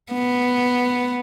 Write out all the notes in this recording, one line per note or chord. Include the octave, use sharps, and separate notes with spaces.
B3